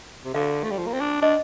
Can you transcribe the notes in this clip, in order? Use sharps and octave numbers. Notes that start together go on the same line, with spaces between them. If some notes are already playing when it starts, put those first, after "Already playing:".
C3
D3 F5
A3
G3
F3
A#3
C4
D4
D4 D#5